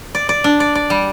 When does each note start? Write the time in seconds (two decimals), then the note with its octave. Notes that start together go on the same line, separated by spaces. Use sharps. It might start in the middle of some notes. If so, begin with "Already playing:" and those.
0.15 D5
0.29 D5
0.44 D4
0.60 D5
0.75 D5
0.90 G3